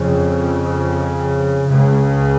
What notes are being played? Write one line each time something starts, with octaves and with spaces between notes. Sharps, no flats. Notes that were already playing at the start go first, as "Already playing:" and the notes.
Already playing: F2 C#3
C#2 C#3